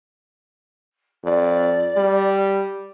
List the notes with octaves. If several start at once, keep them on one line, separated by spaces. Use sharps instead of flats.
F2 D5
G3